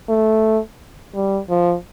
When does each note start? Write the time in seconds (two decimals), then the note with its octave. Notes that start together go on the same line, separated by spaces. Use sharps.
0.09 A3
1.15 G3
1.49 F3